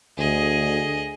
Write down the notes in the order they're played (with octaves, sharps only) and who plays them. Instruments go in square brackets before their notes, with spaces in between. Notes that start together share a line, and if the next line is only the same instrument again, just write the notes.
[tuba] D2 [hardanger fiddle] G#4 D#5